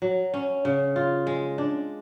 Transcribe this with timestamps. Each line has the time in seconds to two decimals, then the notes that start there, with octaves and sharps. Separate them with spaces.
0.02 F#3
0.34 C#4
0.65 C#3
0.96 F4
1.27 G#3
1.58 D4